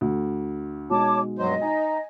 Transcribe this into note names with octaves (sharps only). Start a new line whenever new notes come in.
D2
B2 G#3 D#4 C#5 A5 D6
G2 F#3 C5 D#5
D#4 G#5